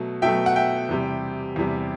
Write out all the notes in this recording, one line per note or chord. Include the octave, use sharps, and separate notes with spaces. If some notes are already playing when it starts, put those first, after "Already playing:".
Already playing: B2 F#3 A3
B2 F#3 A3 E5 G5
F#5
E5 G5
E2 C3 G3
E2 C3 G3